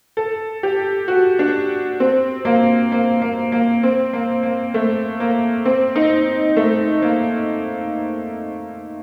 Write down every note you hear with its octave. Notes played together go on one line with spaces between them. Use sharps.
A4
G4
F#4
D4
C4
A#3
A#3
A#3
A#3
C4
A#3
A#3
A3
A#3
C4
D#4
A3
A#3